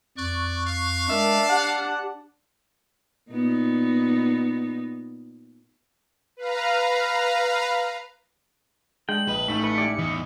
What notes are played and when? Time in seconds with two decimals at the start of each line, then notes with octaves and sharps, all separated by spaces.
0.17 F2 D5 C#6 F#6
0.67 F5
1.09 G#3 D4 A#4 E5
1.49 G4 F#5
3.31 A#2 B3 D#4
6.37 B4 F5 A#5
9.09 G#3 D4 G5 F#7
9.28 A#1 B4 D#5
9.48 A1 A3 D#4 B6
9.64 B4 C#7
9.78 E4 G4 D5
9.99 E2 E3 D#5